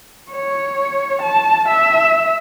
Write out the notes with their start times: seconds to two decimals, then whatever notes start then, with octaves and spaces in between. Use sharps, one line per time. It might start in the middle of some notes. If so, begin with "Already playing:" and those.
0.32 C#5
1.22 A5
1.68 E5